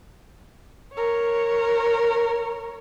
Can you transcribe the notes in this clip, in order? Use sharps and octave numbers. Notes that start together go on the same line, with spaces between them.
A#4 C#5